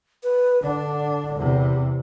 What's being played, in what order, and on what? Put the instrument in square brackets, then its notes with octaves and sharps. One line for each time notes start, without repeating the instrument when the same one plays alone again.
[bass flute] B4
[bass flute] D3 [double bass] D4
[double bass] E2 C3